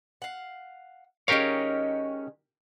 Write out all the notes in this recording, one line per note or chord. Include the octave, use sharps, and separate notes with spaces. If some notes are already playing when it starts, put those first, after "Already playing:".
F5 F#5
D#3 G#3 C#4 G4 A#4 C#5 F5